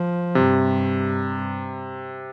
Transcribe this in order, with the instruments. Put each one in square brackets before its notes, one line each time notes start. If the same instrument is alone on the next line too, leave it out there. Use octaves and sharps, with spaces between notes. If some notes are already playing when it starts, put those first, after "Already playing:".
Already playing: [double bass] F3
[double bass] G2 [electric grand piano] C3